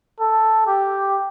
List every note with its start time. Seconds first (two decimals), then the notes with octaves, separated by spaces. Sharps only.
0.20 A4
0.67 G4